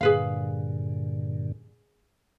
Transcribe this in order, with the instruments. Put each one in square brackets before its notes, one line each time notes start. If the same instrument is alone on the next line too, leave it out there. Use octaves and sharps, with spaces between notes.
[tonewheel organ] G2 A#2 D3 [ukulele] G#4 B4 F5